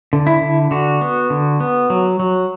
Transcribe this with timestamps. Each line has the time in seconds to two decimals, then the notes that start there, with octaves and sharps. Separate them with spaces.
0.13 D3
0.27 E4
0.41 D3
0.71 D3 F#4
1.01 B3
1.30 D3
1.60 B3
1.90 F#3
2.20 F#3